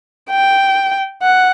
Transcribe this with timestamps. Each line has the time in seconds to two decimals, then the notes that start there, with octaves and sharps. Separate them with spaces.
0.30 G5
1.23 F#5